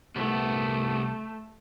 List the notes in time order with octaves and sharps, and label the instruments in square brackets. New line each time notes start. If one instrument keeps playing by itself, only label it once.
[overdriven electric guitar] C2 B3 [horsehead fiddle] A3